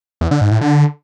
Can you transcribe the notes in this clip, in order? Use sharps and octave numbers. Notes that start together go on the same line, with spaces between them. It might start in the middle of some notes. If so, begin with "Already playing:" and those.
E2
D3
G#2
A2
D3